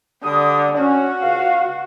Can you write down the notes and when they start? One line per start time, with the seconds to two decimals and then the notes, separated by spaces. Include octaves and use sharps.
0.24 D3 G3 D6 D#6
0.78 C#4 F#4
1.22 C#2 C#3 F5